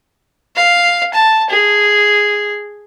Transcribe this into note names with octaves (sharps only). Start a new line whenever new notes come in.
F5
A5
G#4